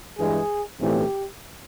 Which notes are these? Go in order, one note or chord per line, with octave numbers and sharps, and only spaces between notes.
G2 E3 G#3 G#4
B1 A2 E3 A3 C4 G4